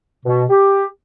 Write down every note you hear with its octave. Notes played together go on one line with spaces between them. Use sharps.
B2
G4